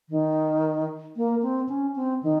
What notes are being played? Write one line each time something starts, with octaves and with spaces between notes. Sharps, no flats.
D#3
A#3
C4
C#4
C4
D#3